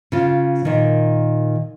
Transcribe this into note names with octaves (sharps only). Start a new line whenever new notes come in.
C#3 F4
A#2 D#3